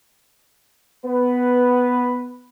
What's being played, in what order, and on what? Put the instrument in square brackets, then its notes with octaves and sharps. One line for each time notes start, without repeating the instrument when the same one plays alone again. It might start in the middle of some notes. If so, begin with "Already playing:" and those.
[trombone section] B3 B4